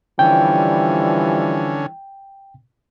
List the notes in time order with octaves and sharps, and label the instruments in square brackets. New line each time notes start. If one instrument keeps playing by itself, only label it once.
[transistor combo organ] D3 C#4 [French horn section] E3 F3 G3 [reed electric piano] G5